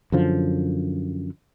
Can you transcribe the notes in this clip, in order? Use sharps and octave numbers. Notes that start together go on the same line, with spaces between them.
F#2 D3 F3